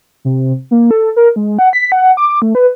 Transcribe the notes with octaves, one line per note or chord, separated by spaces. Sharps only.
C3
A#3
A4
A#4
G#3
F#5
B6
F#5
D6
A3
B4